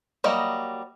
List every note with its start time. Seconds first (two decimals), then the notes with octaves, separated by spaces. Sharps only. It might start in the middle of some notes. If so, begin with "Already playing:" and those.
0.24 F#3 G3 A#3 D#5